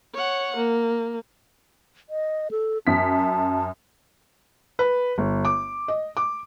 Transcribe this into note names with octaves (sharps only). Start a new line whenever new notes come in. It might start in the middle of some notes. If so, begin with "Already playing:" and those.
C#5 F#5
A#3
D#5
A4
F#2 A5 B6
B4
G1
D6
D#5
D6